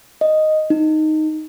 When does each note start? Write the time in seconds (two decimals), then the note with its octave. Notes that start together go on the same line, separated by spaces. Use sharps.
0.21 D#5
0.70 D#4